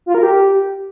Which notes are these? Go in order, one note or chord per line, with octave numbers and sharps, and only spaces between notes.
F4
A#4
G4